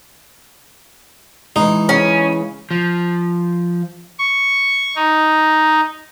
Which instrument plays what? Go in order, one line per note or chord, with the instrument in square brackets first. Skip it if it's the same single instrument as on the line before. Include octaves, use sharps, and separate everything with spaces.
[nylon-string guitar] E3 G#3 [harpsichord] D#4
[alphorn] C#3 [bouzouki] C#4
[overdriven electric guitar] F3
[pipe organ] C#6
D#4